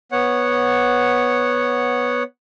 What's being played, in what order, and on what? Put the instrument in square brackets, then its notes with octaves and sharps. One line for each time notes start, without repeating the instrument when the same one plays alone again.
[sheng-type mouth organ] B3 C#5 F#5